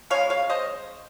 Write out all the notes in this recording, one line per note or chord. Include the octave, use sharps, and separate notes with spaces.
C#3 G#3 C#5 F5
C#5 F5
C5 D#5